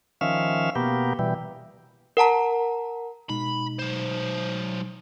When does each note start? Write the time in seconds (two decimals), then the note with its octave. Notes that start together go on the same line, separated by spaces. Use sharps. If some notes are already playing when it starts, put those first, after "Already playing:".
0.21 D#3 F3 C#4 E5 F5
0.75 B2 A#3 B3 G4
1.19 B2 E3 G3
2.17 A#4 F#5 A5 A#5
3.30 B2 G#3 D#4 B5
3.79 F#3 C5